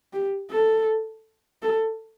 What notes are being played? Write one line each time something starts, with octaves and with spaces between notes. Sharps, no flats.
G4
A4
A4